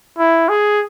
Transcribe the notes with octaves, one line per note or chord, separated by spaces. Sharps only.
E4
G#4